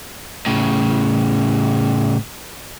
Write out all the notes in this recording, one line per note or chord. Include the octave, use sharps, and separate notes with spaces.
A2 C#3